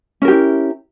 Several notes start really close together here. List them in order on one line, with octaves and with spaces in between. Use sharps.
C#4 A#4 G4 E4